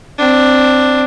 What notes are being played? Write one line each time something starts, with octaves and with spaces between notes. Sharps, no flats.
C4 D4